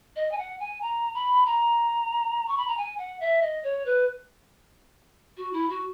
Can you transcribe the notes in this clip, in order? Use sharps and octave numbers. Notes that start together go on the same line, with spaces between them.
D#5
G#5
F#5
G#5
A#5
B5
A#5
C#6
B5
A#5
G#5
F#5
E5
D#5
C#5
B4
F#4
E4
F#4